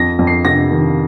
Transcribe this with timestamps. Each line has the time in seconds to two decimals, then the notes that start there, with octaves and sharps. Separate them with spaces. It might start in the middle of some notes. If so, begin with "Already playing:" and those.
Already playing: F2 A#6
0.19 F2
0.27 C7
0.45 C3 A#6
0.71 D#3